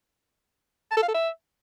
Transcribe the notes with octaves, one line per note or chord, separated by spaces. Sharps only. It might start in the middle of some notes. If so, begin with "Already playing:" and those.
A5
A4
F5
A4
E5